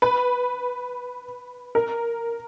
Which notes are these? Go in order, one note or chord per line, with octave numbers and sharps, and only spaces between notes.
B4
A#4